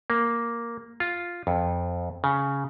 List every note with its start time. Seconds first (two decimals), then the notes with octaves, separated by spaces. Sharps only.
0.10 A#3
1.00 F4
1.47 F2
2.24 C#3